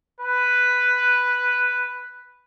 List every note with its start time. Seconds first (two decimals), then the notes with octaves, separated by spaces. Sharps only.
0.20 B4